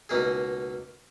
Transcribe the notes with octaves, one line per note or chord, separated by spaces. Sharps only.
C#2 B2 A#3 D#4 G#4